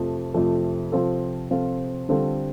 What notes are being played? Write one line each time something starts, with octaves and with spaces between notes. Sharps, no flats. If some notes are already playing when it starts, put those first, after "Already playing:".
Already playing: F2 C3 F3 A3
F2 C3 F3 A3
C3 F3 C4 F4 A4
C3 F3 C4 F4 A4
D3 G3 C4 F4 A4